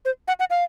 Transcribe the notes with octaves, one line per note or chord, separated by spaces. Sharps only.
C5
F#5
F#5
F5